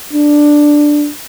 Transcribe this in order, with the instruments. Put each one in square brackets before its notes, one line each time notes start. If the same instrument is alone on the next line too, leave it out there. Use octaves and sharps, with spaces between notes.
[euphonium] D4